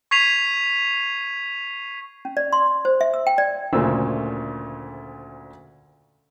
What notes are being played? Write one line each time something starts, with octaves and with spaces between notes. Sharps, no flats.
C#6 G#6 B6 C7 D#7 F7
C#4
D5
C6
C5
E5
E6
G5
D5
D2 A#2 C#3 A3 C5 E6